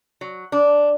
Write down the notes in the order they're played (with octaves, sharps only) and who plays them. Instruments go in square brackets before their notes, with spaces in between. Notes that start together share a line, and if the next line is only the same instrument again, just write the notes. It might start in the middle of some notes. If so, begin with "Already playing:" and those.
[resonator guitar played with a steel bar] F#3
D4